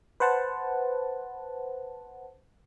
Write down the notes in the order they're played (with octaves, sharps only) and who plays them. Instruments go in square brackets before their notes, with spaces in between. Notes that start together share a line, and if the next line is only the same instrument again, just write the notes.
[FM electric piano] B4 C5 F#5 A5